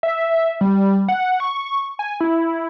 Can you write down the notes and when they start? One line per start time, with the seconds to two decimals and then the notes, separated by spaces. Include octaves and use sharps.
0.03 E5
0.61 G3
1.08 F#5
1.40 C#6
1.99 G#5
2.21 E4